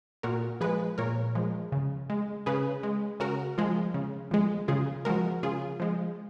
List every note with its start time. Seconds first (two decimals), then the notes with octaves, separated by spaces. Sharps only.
0.23 A#2 F#4 A#4
0.61 F3 G#3 G#4 B4
0.98 A#2 A#4 C#5
1.35 F3 G#3
1.72 C#3
2.10 G#3
2.46 C#3 G#4 B4
2.83 G#3
3.20 C#3 F#4 A#4
3.58 F3 G#3
3.94 C#3
4.31 F3 G#3
4.68 C#3 F4 G#4
5.05 F3 G#3 F#4 A#4
5.43 C#3 F4 G#4
5.80 F3 G#3